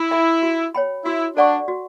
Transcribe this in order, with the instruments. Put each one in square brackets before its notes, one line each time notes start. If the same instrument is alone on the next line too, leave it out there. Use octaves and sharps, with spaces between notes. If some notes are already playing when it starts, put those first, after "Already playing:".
Already playing: [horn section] E4
[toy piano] A4 E5 G5 B5
F#4
C#5 G5 B5
[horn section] E4 [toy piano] F#4
[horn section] D4 [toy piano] A4 D5 F#5 C#6
[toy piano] F#4